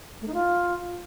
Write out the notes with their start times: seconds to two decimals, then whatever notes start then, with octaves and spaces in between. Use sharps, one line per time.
0.21 A3
0.28 D#4
0.34 F4